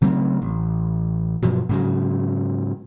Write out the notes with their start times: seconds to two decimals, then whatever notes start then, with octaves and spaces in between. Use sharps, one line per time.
0.02 C#3 F#3 A3 C4
0.42 A1
1.43 G2 B2 F3 F#3
1.69 G#2 C#3 F#3